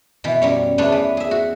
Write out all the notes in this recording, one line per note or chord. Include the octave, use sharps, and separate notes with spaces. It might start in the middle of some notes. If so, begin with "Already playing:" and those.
B2 E3
F#2 G3 C#5
E2 A3 B3 D4 C#5
E3
G#4 E5
F#4